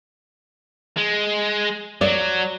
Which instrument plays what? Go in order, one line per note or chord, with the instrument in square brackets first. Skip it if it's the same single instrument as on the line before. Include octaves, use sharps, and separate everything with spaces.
[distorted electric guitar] G#3
[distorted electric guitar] F#3 [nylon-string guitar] D5